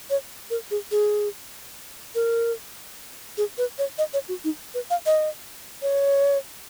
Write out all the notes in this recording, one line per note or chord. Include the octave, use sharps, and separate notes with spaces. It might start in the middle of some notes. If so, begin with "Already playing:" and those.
C#5
A#4
G#4
G#4
A#4
G#4
B4
C#5
D#5
C#5
F#4
D#4
B4
F5
D#5
C#5